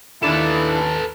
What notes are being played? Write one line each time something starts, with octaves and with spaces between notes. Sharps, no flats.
D#2 D4 E4 A4 B4 E7